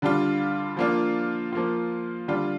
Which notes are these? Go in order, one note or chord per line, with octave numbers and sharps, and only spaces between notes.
D3 G3 D4 F4
F3 A#3 D4 F4
F3 A#3 F4
D3 G3 D4 F4